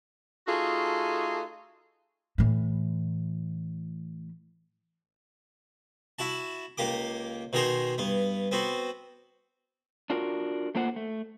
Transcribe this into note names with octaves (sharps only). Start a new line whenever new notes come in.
A3 D#4 F4 F#4 G#4 A4
A2 E3
E4 F#4 A5
C#2 A#3 G4 D6
B2 D#3 G#4 A#4 C5
G2 B3
B3 C4 F#4
D4 F4 F#4 A#4
A3 A#3 F4 C5 F#5
A3